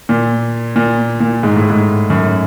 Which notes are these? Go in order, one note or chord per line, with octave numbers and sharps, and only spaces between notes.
A#2
A#2
A#2
G#2
A2
G#2
F#2